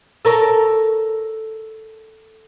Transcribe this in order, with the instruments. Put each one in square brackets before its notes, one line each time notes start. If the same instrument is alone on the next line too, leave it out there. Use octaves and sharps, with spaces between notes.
[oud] A4 A#4 C#5